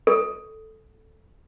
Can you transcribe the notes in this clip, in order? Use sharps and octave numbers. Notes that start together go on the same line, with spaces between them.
A4